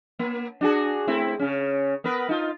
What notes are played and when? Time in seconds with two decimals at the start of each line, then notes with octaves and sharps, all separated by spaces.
0.19 A#3
0.61 D4 F#4 G#4
1.08 A3 C4 E4
1.40 C#3 C#4
2.04 B3 A#4 B4
2.29 D#4 F4